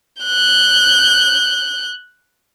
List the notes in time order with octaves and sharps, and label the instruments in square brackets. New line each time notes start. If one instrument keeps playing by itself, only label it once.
[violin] F#6 G6